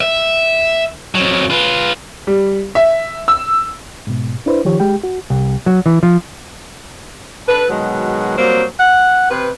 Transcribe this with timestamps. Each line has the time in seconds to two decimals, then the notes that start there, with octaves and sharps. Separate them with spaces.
0.01 E5
1.15 F2 F#3
1.50 F4 B4
2.27 G3
2.75 E5
3.28 E6
4.07 G#2 B2
4.46 D4 E4 B4 C5
4.65 D#3 F3 G4 C#5
4.80 G#3 G4 G5
5.04 F#4
5.30 C2
5.66 F#3
5.86 E3
6.03 F3
7.48 D4 A4 B4
7.69 B2 D#3 F#3 G#3
8.38 C3 F#3 G3 A#3 C5
8.79 F#5
9.30 C3 B4